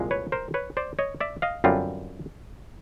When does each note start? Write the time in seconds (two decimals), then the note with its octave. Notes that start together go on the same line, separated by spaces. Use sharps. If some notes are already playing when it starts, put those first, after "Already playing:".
Already playing: C2 A#2 F3 G#3
0.11 B4 C#5
0.32 A#4 C5
0.54 B4 C#5
0.77 C5 D5
0.99 C#5 D#5
1.20 D5 E5
1.42 D#5 F5
1.64 F#2 D3 G3 C4 F4